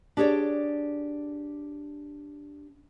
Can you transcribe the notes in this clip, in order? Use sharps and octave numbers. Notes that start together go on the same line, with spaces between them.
D4 G4 G#4 C#5 D5